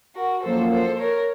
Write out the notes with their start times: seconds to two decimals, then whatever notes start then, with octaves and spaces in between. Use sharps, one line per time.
0.15 F#4 A#4
0.43 F#2 F3 A#3 F4 A4 C5
0.71 A4 C5
0.99 A#4 C#5